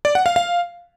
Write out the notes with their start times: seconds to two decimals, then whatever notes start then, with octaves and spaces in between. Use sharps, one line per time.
0.05 D5
0.15 F#5
0.26 F5
0.36 F5